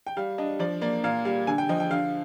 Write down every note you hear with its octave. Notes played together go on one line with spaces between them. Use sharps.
G5
G3 F5
D4 D#5
F3 D5
A#3 D5
A#2 F5
G3 F5
D3 G#5
G5
F3 D#5
G5
D3 F5